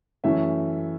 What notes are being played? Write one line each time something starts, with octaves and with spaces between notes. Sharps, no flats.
F#2 E3 A3 C#4 E5